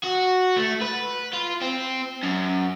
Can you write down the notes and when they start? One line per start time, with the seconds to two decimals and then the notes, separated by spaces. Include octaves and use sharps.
0.03 F#4
0.56 A3
0.81 B4
1.33 F4
1.61 C4
2.23 F#2